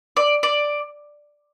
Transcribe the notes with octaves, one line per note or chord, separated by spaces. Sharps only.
D5
D5